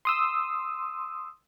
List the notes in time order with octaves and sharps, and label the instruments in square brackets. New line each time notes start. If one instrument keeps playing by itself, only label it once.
[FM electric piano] C6 D#6 E6